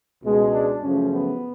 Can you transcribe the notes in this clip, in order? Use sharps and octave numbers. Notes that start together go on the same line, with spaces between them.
C#2 B2 G#3
D4
F#2 C#3 F3 A3 C#4
B3